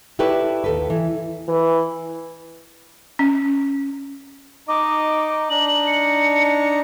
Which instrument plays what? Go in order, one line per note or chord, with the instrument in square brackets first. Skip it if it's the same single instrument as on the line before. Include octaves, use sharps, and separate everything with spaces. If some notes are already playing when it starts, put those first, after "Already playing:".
[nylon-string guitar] E4 G4 A4 B4 C#5 D5
D#2 A4 B4
E3
[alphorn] E3
[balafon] C#4
[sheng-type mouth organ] D#4 D#5 [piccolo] D6
[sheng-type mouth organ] D4 D#4 A#5 [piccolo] F#7
[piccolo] C#7